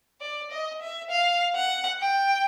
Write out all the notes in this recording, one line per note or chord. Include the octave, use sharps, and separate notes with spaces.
D5
D#5
E5
F5
F#5
G5